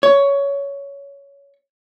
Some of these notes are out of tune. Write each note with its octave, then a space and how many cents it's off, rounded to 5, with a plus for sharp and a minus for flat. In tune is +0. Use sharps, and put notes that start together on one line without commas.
C#5 +15